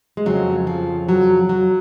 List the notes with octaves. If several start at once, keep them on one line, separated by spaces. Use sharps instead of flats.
G#3
F2 C#3 F#3
F3
F#3
F#3